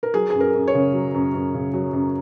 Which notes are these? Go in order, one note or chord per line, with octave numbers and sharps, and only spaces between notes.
A#4
F#3 G#4
F#2 G#4
A#4
F#2
C#5
C#3
F#3
F#2
F#2
C#3
F#3
F#2